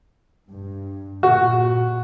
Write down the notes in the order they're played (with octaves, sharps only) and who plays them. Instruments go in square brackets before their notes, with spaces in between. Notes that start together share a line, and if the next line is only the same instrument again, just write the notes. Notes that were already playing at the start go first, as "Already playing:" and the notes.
[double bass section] G2
[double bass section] A#2 [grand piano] F#4